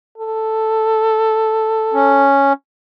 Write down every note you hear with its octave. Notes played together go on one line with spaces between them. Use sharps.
A4
C#4